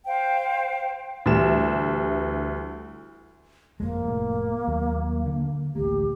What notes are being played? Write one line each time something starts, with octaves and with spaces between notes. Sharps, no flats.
C5 F5 G5
D2 E3 G3 E7
G1 F2 G#3 A#3
F1 A2
D#2 F#3
D3
A1 D2 A#3 G4